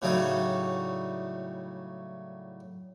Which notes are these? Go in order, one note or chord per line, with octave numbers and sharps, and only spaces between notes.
A2 C#3 F#3 G3 D#4 A4